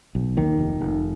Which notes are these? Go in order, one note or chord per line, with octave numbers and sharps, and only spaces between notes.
B1
D#2 D#3
F1
F1